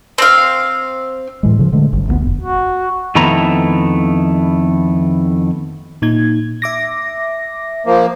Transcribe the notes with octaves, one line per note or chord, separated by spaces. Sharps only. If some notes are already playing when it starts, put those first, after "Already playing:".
C4 F5
A2 E3 G#3
C#3 F3
D3 G#3 A3
G1 G2
D2 G#3 B3
F1 A#1
F#4
F2 D#3 A3 B3 E4 A#5
A#2 D#4 G#6
E5 D6 A#6
F3 A#3